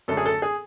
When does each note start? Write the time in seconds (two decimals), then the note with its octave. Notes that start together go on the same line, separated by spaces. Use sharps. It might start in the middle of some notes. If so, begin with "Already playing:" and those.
0.08 F#2 D3 A3 A4
0.17 G#4
0.26 A4
0.42 G#4